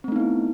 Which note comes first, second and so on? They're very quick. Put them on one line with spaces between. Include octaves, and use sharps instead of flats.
C4 A3 D#4 B3 E4